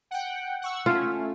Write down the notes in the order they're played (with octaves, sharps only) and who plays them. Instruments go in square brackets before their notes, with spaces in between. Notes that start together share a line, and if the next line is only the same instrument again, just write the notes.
[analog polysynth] F#5 G5
F#5 C#6 E6
[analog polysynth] A3 C#4 [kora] F4